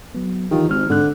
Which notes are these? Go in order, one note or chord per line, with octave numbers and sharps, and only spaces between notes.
F#3 B3
D#3 E3 F4 G4
G#1 C4 F6
G#2 D3 F#6